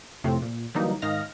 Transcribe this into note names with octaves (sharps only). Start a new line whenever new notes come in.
F2 A2 C3 F3 A3 C4
A#2
D3 E3 F#3 G3 A#3 D#4
G#2 D#3 D#5 F5 F6 A#6